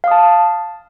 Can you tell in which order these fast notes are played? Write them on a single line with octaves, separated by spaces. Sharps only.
F5 D#6 A5